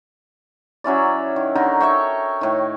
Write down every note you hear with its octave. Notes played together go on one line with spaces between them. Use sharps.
F#3 C#4 E4 D5
D#3
D3 D#4 A#4
C#5 E5 G5 C#6
A2 D#3